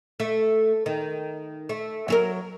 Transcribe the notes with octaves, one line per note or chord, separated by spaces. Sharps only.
A3
D#3
A3
F#3 A4 A#4